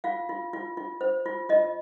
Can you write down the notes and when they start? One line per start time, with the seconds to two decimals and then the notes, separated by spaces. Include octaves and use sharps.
0.04 F4 F5
0.29 F4
0.53 F4
0.77 F4
1.01 C5
1.26 F4
1.49 F4 D#5